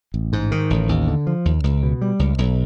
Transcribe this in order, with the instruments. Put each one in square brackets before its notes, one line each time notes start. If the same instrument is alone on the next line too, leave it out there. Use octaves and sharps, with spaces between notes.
[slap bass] A1
G#2
D#3
A1
D#2
D3
F3
D#2
C#2
B2
G3
C#2
B1